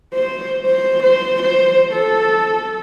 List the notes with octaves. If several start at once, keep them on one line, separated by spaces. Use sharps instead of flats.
C5
C5
C5
C5
A4